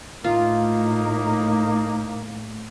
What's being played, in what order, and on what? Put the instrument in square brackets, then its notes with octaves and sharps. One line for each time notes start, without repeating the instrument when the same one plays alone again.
[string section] A2 [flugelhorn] A#3 [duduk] D#4 [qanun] F4